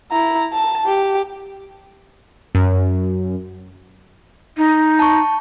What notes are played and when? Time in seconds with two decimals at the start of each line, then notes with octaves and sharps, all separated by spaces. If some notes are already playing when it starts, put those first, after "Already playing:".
0.11 E4 A#5
0.53 A5
0.86 G4
2.55 F#2
4.57 D#4
4.99 A5 C#6